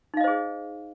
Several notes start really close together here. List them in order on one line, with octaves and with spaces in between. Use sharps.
D#4 F5 D#5 C5 G#4